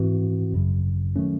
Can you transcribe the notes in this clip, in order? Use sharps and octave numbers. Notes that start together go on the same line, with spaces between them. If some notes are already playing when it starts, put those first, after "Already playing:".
Already playing: G#2 E3 C4 F#4
G#1 F#2 C#3 F#3
D#3 F#3 A3 C#4